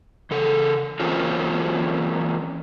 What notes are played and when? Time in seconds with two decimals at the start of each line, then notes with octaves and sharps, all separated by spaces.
0.31 C#3 A4
1.00 E3 F#3 A#3 C4 C#4 F4